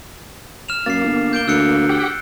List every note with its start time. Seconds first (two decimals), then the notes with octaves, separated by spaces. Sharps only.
0.69 F6 E7 F7
0.86 F#2 A#3 A6 C7
1.04 G1
1.33 G6 D7 G7
1.48 D2 E6 F#6 C#7
1.89 G4 F#5 G5